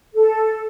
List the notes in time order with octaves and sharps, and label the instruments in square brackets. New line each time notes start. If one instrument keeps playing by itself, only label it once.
[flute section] A4